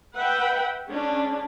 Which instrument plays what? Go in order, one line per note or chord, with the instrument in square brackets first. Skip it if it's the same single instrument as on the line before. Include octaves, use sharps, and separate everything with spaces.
[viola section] B4 E5 F#5 G5
G#3 C#4 D4